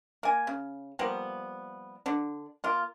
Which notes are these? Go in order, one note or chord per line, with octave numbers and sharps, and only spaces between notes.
A#3 G#5
C#3
F3 G3 A#3 B3
D3 D4
A#3 F4